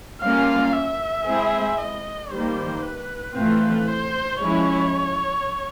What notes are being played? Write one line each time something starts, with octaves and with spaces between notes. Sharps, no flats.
G3 A#3 C#4 F4 F5
E5
G#3 C4 E4 G#4
D#5
D#3 G3 A#3 C5
B4
A2 E3 A3 C4 F4 B4
C5
F3 G#3 C#4 E4 C#5